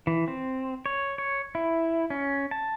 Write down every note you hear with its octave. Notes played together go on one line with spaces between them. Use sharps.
E3
C4
C#5
C#5
E4
C#4
A5